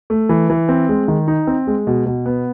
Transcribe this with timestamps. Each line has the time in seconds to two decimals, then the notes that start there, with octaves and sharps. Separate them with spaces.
0.10 A3
0.29 E3
0.50 E3
0.69 C4
0.89 G#3
1.08 D#3
1.27 D#4
1.47 C4
1.67 G#3
1.87 B2
2.06 B2
2.26 B3